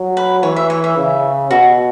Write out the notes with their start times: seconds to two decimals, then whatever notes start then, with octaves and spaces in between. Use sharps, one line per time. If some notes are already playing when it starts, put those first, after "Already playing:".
Already playing: F#3
0.17 B4
0.43 E3 C#5
0.56 E5
0.70 C#5
0.84 E5
0.97 C#3
1.51 B2 F#4